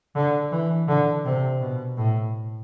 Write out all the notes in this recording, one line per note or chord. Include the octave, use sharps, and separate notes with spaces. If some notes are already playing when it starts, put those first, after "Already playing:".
D3
E3
D3
C3
B2
A2